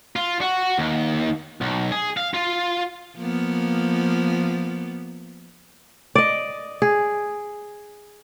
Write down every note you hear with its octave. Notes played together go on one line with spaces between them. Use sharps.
F4
F#4
D#2
B1
G#4
F5
F4
F3 A#3 B3
D5 D#5
G#4